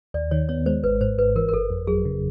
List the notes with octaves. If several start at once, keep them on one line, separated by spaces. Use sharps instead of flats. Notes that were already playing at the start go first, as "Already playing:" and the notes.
D#2 D5
D#3 C#5
B3 C#5
G#3 C5
G#1 B4
G#2 C5
G#1 B4
E3 A#4
A#4
G1 A4
F2
F#3 G#4
C#3